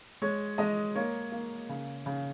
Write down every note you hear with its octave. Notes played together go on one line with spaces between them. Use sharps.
G#3 C#5
G#3 D#5
A#3 C#5
A#3
C#3
C#3